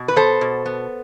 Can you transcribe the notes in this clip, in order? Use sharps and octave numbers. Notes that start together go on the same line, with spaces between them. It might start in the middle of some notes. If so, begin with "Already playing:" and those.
Already playing: B2
B4
B3 A4 C5
B2
B3